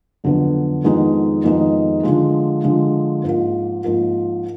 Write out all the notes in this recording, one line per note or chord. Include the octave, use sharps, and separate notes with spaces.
F2 D3 F#3 B3
F2 D#3 G#3 B3 D#4
F2 D#3 G#3 B3 D#4
D3 F3 G#3
D3 F3 G#3
G#2 F3 A#3 F4
G#2 F3 A#3 F4